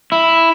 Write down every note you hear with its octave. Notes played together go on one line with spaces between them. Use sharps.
E4